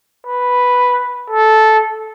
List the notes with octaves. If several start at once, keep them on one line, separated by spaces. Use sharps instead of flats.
B4
A4